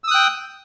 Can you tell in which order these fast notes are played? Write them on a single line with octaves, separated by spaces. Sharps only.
E6 D#6 F#6 G5